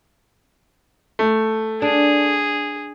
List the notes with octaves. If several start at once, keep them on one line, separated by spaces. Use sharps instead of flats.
A3
D4 G#4